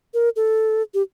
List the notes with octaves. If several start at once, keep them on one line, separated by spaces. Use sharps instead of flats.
A#4
A4
G4